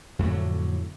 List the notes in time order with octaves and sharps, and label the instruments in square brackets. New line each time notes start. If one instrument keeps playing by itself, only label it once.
[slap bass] F2 A2 D3 F#3